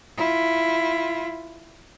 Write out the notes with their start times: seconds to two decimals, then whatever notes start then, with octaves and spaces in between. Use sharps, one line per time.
0.17 E4 F4